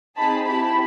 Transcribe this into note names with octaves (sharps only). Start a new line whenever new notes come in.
C4 D#4 G#4 A5 B5
C4 E4 G4 A5 B5